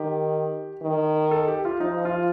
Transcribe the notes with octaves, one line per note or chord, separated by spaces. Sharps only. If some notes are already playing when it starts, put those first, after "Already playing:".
Already playing: D#3 G4
D#3
A4
G4
F4
F3 D#4
F4